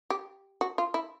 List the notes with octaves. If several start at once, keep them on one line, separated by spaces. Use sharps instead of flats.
G4
F#4
F4
E4